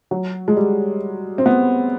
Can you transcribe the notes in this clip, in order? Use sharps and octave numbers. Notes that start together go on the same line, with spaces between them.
F#3
G#3
G3
C4
B3